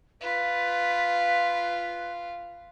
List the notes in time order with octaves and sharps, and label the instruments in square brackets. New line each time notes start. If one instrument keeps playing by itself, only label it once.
[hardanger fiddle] F4 [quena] B4